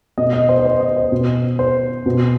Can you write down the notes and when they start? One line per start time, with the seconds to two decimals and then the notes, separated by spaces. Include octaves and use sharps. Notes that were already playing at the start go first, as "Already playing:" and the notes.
0.18 B2 D#5
0.33 D#5
0.49 C5
0.59 D#5
0.65 C5
0.80 D#5
0.96 C5
1.12 B2
1.59 C5
2.06 B2